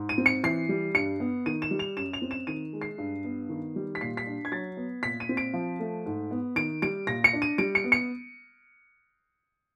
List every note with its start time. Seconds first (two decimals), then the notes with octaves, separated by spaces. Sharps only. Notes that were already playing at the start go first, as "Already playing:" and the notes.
Already playing: G#2
0.09 D#7
0.18 C4
0.26 C#7
0.43 E3 C7
0.69 G3
0.94 G2 C#7
1.20 B3
1.46 D#3 D#7
1.62 E7
1.71 G3
1.79 F7
1.97 F#2 E7
2.14 F7
2.22 C4
2.31 E7
2.47 D#3 D#7
2.73 G#3
2.82 C7
2.98 G2
3.24 B3
3.49 D#3
3.76 G3
3.95 B6
4.01 A#2 C7
4.17 B6
4.27 D4
4.45 G#6
4.52 F#3 A6
4.77 B3
5.03 A#2 B6
5.20 D#7
5.29 C4
5.37 D7
5.54 F3
5.80 A3
6.06 G#2
6.31 B3
6.56 D#3 D7
6.82 G3 D7
7.07 A#2 A#6
7.24 C#7
7.33 D4
7.42 D#7
7.58 G3 D7
7.75 C#7
7.84 B3
7.92 C#7